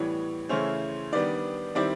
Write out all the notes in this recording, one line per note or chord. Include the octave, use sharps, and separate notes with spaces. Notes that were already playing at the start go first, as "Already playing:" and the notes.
Already playing: A2 E3 G3 B3 C#5
C#3 E3 A3 C#4 E4 C5
D#3 G3 B3 D4 D5
D#3 G3 C4 E4 D5